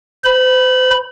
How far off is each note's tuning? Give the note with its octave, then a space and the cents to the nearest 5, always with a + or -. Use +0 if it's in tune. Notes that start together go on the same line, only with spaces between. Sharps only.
C5 -40 B5 +0